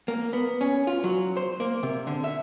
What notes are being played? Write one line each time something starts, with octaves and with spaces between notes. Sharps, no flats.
A#3
B3
C#4
F4
F#3
C5
A#3
C3
D3
E5